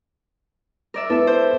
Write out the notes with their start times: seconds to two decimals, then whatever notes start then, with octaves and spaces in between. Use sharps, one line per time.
0.94 A#4 D5 E5
1.10 B3 E4 A4 B4 E5
1.27 C5